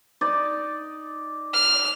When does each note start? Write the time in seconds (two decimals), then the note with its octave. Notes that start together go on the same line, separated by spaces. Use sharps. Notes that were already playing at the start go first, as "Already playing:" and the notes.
0.21 D#4 D5
1.53 F6